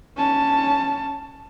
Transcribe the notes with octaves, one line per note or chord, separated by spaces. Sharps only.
C#4 A5